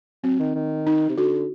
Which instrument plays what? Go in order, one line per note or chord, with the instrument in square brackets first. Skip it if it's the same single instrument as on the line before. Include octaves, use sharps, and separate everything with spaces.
[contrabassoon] F#3 [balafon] C4
[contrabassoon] D#3
D#3
[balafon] D#4
[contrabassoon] C3
[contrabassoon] D3 [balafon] F#4